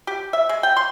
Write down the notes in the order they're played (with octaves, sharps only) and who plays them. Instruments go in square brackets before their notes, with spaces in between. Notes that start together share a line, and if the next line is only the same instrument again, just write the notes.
[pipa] G4
E5
G#3
G5
C6